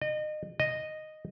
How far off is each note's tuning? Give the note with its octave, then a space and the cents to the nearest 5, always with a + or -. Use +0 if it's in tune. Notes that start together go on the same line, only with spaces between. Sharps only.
D#5 -30
D#5 -5